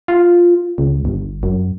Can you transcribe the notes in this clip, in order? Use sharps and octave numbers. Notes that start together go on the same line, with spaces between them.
F4
C#2
G1
F#2